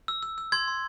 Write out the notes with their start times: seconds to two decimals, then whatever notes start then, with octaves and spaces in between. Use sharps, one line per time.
0.08 E6
0.23 E6
0.38 E6
0.52 C6 G#6
0.68 C6